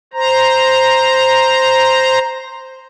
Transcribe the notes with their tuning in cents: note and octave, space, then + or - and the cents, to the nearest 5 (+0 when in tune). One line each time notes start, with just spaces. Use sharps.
C5 +0 A#5 +0